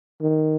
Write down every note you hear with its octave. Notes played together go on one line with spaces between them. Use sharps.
D#3